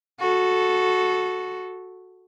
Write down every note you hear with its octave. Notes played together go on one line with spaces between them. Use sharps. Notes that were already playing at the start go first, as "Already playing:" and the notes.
F#4 A4